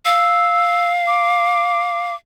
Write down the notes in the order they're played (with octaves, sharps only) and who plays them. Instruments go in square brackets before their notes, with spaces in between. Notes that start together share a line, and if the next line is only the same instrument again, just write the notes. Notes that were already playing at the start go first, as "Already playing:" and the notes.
[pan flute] F5 [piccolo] E6
[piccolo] D6